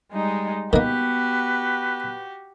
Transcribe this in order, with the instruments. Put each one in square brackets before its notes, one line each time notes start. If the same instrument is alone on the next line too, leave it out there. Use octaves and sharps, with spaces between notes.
[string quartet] G3 G#3 D#4
[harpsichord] D#3 A#3 [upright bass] B3 [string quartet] F#4 G4 [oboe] B4